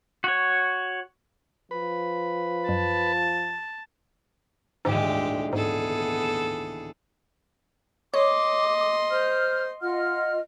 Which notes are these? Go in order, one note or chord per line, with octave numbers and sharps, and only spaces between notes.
F#4 C#5
F3 B4 B5
F#2 A5
D#1 A1 D2 G#2 G#3 G4
G#2 B3 G#4 A4
E7
C#5 D#5 C6 D6
C5 F6
F4 D#5 F#5 F6